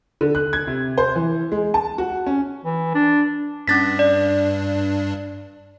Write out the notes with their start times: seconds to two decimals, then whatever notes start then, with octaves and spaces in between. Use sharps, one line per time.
0.21 D3
0.35 F#6
0.53 G#6
0.67 C3
0.98 C5
1.16 E3
1.52 G#3
1.74 A5
1.98 F#4
2.27 C#4
2.65 E3
2.94 D4
3.68 G2 C#4 D4 A6 B6
3.99 D5